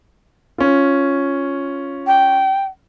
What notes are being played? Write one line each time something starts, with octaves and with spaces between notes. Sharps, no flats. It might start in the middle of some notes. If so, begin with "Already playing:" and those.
C#4 F4
G5